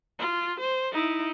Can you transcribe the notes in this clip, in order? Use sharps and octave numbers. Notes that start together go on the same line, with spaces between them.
F4
C5
D#4 E4